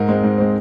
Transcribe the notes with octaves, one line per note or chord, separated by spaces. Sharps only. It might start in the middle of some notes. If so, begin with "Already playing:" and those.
Already playing: G#2 A#4
G#3 C4
G#2
G#3 C4